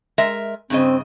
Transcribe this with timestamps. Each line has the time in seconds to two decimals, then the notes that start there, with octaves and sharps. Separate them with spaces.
0.18 G#3 A#4 E5
0.70 G2 C#3 C4 D#5